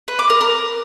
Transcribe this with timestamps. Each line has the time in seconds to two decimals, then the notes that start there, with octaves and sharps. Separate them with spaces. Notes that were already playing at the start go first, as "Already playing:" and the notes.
0.08 B4
0.19 D6
0.30 A#4
0.41 A#4